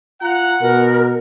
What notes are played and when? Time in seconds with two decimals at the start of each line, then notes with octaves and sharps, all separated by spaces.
0.22 F4 F#5 A#5
0.61 B2 A#4